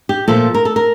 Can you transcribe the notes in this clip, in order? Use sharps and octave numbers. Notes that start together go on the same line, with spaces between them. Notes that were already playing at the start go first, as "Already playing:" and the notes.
G4
A#2 F3 A3 A4
A#4
A4
A#4